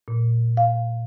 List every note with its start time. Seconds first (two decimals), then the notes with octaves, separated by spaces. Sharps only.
0.08 A#2
0.57 F5